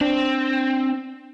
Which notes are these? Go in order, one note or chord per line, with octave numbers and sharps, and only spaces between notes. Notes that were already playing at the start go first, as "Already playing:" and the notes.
C4 D4